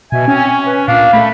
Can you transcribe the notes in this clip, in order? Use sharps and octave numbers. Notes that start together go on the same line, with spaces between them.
B2 E5 G#5
C4 C#4
B4
A#2 D4 F5
A3 B5